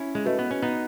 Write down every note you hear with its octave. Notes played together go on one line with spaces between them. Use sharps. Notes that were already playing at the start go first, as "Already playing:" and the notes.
Already playing: C#4 E4
G#3
A3 F#4 B4 D#5
B3
C#4
B3 D#4